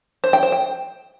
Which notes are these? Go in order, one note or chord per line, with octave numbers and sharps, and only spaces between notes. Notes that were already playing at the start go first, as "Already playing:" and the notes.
C5
G5
C5
G5